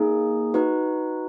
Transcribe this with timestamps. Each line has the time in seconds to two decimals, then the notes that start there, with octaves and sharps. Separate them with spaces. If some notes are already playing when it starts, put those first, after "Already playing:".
Already playing: A#3 D#4 G#4
0.54 D#4 F#4 B4